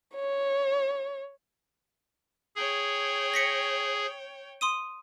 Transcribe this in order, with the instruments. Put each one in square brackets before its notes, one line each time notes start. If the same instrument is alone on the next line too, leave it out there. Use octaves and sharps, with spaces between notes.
[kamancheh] C#5
[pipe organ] G#4 [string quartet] C#5 G5
[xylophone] A#6 B6 C#7
C6 D#6 D#7